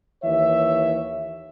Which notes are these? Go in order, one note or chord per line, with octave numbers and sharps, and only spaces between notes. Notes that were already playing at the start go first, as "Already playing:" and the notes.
D#2 E3 C#5 E5